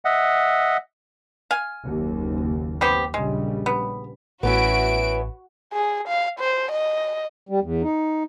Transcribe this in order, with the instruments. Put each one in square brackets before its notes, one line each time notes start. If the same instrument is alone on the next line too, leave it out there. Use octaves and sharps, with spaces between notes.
[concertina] D#5 E5 F#5
[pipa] F5 G#5
[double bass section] F#1 D#2
[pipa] B3 C4 G4
[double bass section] A#1 C#3 G3 [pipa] G#3
[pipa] B3
[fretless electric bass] A1 [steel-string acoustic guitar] B3 C#4 E4 [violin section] F#4 D7
[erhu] G#4
F5
C5
D#5
[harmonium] G3
E2
D#4